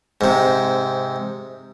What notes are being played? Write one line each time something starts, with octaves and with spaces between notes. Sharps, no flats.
G#2 C3